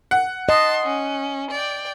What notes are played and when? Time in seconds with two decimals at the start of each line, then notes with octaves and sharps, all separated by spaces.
0.11 F#5
0.49 D#5 A5 C6
0.86 C#4
1.51 D5 G5